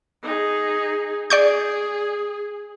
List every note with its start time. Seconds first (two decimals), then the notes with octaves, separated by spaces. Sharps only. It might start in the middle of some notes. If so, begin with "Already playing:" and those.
0.23 D#4 G#4
1.30 G#4 D5 C#6 G6